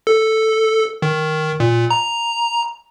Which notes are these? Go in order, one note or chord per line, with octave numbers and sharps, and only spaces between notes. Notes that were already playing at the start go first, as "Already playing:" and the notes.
A4
D#3
A#2
A#5